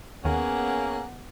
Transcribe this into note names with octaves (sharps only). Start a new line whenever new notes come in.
D#2 D#3 A#3 B3 C#4 G#4 F#5